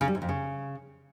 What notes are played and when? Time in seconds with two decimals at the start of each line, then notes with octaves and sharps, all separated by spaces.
0.01 C#3
0.08 G3
0.15 G#2
0.22 F2
0.29 C#3